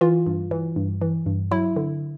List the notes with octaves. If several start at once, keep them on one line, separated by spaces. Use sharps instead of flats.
E3 F4
G2
E3
G2
E3
G2
F#3 E4
D3